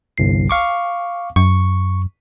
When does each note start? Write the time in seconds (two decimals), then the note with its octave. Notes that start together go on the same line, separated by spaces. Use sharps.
0.18 G1 C2 C7
0.50 F5 C#6 D6
1.36 F#2 C#6